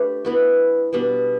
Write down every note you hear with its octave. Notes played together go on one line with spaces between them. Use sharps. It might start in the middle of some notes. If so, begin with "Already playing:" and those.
Already playing: A3 D4 G4 B4
E3 B3 F#4
B2 G3 B3 D4